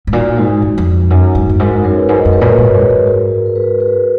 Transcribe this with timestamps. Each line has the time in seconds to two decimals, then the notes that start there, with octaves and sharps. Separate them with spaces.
0.07 G#2
0.13 A#2 D#4 F#4
0.38 G#2
0.62 F2
0.78 F2
1.10 F#2 D#4 F#4
1.35 G#2
1.49 F#2
1.60 G#2 F#4 A#4
1.84 F#2 A#4 C#5
1.96 G#4 B4
2.08 G#2 F#4 A#4
2.17 D#5
2.25 F#2 C#5
2.33 G#4 B4
2.41 A#2
2.57 G#2 A#4 C#5
2.74 F#2 A#4
2.82 G#4 B4
2.90 G#2
3.07 F#4 A#4
3.46 A#4
3.55 G#4 B4
3.80 G#4 B4